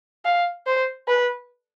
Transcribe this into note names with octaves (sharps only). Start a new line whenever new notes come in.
F5
C5
B4